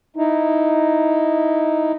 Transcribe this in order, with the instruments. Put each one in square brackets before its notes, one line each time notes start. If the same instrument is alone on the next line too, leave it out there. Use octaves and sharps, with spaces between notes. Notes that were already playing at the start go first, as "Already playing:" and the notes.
[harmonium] D#4 E4